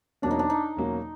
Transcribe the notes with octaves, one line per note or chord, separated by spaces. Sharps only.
E2 B2 F#3 A#3 C#4 D4
D#4
D4
D#4
E2 B2 F#3 A#3 C#4